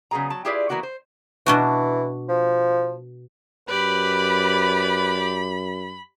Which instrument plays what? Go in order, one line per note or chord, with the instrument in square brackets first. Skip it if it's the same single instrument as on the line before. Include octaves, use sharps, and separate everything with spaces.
[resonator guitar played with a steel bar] C#3 F#3 B3 G#4 G#5 A#5
F#3 A5
E4 F4 G4 G#4 B4 D5
E3 A#3 B3 F#4 D5
C5
[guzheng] B2 D4 F#4 [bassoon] E3
[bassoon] F3
[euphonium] F#2 [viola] G4 D5 [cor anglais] B4 [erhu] B5